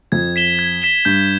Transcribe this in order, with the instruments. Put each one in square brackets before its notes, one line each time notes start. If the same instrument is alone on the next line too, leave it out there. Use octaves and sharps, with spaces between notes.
[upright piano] F2 [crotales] G#6
[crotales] B6 E7 G7
G#6
B6 E7 G7
[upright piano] G2 [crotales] G6